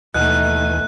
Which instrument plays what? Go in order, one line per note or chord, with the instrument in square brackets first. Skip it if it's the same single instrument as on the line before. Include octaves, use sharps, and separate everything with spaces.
[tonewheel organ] D#2 E3 G#5 [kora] B2 [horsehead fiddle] A3 D#4 [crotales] F#6